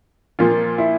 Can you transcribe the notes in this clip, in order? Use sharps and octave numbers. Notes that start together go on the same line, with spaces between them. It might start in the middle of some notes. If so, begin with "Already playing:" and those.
A#2 F3 A#3 F4
E4